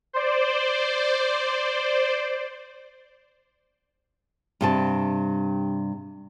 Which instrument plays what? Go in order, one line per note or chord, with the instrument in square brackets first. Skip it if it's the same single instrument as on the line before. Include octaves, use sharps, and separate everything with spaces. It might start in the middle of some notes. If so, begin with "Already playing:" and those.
[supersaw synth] C5 D5
[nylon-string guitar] G2 C3 A5